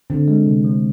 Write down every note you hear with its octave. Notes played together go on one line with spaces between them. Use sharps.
D3 C4
G#3
C3
F3